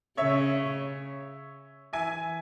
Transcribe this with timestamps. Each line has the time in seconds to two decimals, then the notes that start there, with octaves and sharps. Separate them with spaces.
0.17 C#3 C#5 E5
1.93 E3 E5 G#5